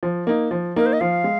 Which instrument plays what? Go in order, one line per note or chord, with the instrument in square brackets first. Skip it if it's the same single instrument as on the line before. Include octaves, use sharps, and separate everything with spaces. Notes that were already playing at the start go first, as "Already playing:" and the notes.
[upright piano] F3
A#3 D#4
F3
[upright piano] A#3 D#4 [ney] A#4
[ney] C5
D#5
[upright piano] F3 [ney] F5
[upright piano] G#3